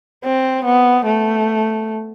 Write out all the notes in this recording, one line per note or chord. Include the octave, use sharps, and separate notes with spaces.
C4
B3
A3